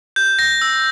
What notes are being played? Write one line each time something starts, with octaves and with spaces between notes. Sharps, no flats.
G6
A#6
E6